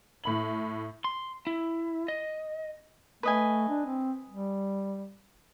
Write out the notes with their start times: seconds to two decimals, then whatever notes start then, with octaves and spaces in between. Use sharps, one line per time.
0.24 A2 B5 F#7
1.04 C6
1.47 E4
2.08 D#5
3.23 A3 B4 D#5 G#5
3.69 D4
3.85 C4
4.30 G3